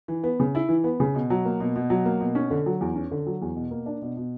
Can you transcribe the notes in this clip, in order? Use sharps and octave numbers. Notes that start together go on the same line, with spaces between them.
E3
B3
C#3
E4
E3
B3
C#3
B2
F#3
A#3
B2
B2
F#3
A#3
B2
C#4
D3
F#3
E2
C#4
D3
F#3
E2
B2
A#3
D4
B2
B2